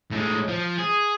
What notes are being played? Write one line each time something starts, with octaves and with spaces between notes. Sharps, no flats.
A2 G#3
F3
G#4